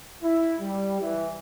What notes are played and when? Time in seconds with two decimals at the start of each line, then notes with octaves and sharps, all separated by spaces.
0.23 E4
0.60 G3
1.01 E3